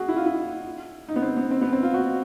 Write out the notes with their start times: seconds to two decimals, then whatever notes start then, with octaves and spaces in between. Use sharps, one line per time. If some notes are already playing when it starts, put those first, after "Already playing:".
Already playing: F#4 G#4
0.08 E4
0.16 F4
0.26 E4
1.08 D#4
1.16 B3
1.22 C4
1.37 B3
1.51 C4
1.61 B3
1.73 C4
1.83 F4
1.94 F#4